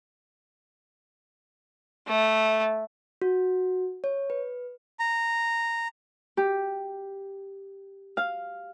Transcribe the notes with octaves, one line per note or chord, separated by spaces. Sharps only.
A3
F#4
C#5
B4
A#5
G4
F5